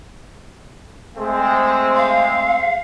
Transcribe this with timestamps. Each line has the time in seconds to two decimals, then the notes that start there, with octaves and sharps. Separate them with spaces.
1.15 G#3 A3 C4
1.96 F5